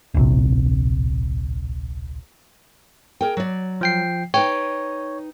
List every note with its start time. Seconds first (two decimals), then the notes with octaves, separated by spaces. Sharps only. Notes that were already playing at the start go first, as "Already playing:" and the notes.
0.14 D1 A#1 C3
3.21 G#4 A#4 G5
3.37 F#3 D5
3.81 F3 G5 C7
4.34 D#4 B4 C#5 G5